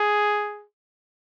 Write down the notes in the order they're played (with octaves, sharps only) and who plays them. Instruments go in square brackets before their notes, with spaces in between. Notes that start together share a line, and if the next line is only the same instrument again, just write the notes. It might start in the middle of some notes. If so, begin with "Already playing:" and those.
Already playing: [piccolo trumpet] G#4